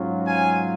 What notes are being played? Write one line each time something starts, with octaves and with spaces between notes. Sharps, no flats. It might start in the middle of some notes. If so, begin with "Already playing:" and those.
Already playing: G#2 F#3 C#4 F4
F5 G#5